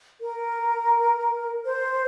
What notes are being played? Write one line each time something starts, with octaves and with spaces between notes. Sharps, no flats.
A#4
C5